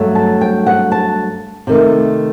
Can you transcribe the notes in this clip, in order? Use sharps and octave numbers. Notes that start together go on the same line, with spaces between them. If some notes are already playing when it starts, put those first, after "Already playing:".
Already playing: G2 F#3 A3
A5
G5
F#5
A5
C3 D#3 A3